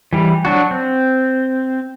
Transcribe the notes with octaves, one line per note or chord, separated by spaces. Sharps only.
E3 G3
F#3 D4 F#4
C4